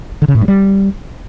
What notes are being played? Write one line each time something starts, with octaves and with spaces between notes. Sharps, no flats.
D3
C#3
A2
G2
G3